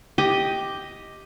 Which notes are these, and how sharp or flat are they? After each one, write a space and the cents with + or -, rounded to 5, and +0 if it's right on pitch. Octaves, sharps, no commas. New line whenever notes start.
G4 +0 D#5 +5